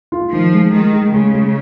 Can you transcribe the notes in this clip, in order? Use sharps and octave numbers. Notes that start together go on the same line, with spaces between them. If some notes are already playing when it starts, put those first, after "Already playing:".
F4
D#3 F3
G#3
D#3 G#3
G#3
C#3 G#3
G#3